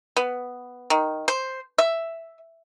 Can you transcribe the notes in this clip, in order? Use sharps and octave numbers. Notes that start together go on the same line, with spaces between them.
B3
D#3
C5
E5